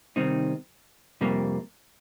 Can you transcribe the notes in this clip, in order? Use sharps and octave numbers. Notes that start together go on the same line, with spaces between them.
C3 D#3 G3 C4 D#4
F2 C3 G3 A#3